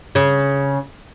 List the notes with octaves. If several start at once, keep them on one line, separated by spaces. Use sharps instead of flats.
C#3